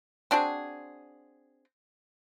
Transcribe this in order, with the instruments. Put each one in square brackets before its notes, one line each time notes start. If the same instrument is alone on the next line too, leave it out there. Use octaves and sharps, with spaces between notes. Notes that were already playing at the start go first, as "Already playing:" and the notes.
[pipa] C4 D4 F#4 G#4